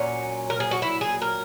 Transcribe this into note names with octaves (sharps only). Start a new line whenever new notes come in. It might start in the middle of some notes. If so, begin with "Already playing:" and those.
Already playing: A#2 F#3 C#4
A#4
G#4
F#4
E4
G#4
A#4